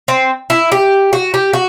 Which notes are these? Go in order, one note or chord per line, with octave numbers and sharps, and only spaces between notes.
C4
E4
G4
F#4
G4
F#4